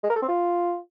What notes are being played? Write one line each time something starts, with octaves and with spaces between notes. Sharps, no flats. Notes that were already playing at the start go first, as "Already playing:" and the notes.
G#3
A#4
A4
C4
F4